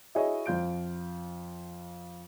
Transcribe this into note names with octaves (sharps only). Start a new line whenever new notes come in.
E4 F#4 G#4 C#5 D#5 E5
F2 F4 G6 D7